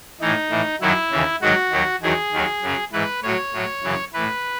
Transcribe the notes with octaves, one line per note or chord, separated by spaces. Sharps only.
A2 E3 D#4
A2 E3
F#2 D#3 F#3 E4
D#2 C#3 E3
G#2 D#3 F#3 F#4
D#2 D#3 F#3
E2 D#3 F#3 G#4
D#2 D#3 F#3
F#2 C#3 F#3
G#2 E3 B4
A2 F#3 C#5
A2 F#3
F#2 C#3 E3
A2 E3 B4